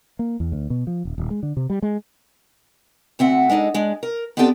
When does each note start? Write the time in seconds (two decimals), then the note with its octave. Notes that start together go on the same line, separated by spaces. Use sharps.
0.19 A#3
0.40 E2
0.52 D2
0.70 B2
0.87 F3
1.05 D#1
1.18 D#1
1.30 G#3
1.43 D3
1.57 C3
1.70 G3
1.82 G#3
3.19 D2 C4 E5 F#5
3.49 G#3 D4 D#4 A4
3.74 G#3 D4
4.03 A#4
4.37 B3 C4 D4 G4 A4 G5